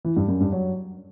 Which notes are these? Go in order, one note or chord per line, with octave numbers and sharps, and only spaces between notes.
E3
G2
F#2
G2
F#3